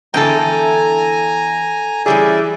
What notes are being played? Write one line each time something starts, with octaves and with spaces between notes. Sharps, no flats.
E2 D3 E3 A4 G5 G#5 A#5
E3 G3 C#4 G#4 D5 E5